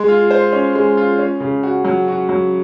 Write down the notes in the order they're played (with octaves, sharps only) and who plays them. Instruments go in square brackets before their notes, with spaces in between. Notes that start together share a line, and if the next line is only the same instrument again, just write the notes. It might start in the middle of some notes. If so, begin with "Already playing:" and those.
Already playing: [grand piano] G#3
F4
C5
C#4
G#3
F4
C#4
C#3
F#4
F#3
F#4
F#3